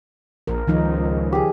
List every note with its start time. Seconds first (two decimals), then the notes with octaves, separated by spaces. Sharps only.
0.47 A#1 A#4
0.67 C#2 D#3 F3 D#4
1.33 G4 G#4